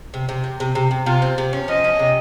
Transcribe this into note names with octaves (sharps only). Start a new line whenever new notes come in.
C3
C3
C4
C3
C3
C3
C3 F4
C4
C3
C#4
F3 D#5
C#4
C3